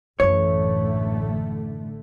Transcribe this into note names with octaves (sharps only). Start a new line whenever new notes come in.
A1 F#2 D3 E3 A3 C#5